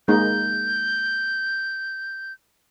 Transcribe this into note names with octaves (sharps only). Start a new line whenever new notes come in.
G#3 A#3 D#4 G6